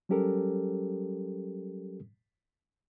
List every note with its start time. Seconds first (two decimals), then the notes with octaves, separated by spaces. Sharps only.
0.09 F#3 G3 C#4 G4 A4 A#4